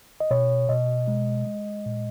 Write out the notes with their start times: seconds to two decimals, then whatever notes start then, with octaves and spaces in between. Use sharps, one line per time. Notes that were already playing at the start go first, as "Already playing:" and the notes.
0.20 D#5
0.31 B2 C#5
0.69 B2 D#5
1.08 G#3
1.47 G#3
1.86 A#2